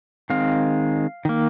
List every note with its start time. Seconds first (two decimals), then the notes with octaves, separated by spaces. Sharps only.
0.30 D#3 G#3 C4 F5
1.25 D#3 A#3